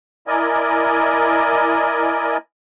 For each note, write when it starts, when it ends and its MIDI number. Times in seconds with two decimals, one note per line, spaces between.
0.27 2.37 64
0.27 2.37 70
0.27 2.37 74
0.27 2.37 75
0.27 2.37 80